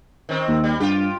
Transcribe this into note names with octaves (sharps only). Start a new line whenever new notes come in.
D#3 C4
D#2
G3
G2 F4 G4